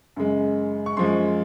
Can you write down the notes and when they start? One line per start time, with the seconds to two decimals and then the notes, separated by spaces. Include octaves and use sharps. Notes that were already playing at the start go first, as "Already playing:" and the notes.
0.16 F#2 C#3 G#3
0.86 C#6
0.97 F#2 F3 G#3 C6